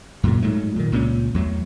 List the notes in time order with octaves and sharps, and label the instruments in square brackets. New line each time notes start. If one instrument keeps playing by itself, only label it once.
[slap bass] F#2 A#2 C#3
G#2 F#3 A3
A#2 D#3
C#2 A#2 G#3 C#4
E2 F#3 A3